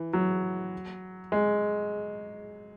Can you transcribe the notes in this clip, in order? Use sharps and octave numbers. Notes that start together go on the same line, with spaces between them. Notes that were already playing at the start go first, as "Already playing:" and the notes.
Already playing: E3
F#3
G#3